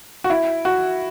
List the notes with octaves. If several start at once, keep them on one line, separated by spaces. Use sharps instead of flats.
F#4
E4
F#4